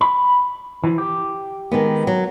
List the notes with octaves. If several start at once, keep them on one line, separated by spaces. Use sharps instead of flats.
B5
E3 F3
G4
D#3 G#3 B3
F#3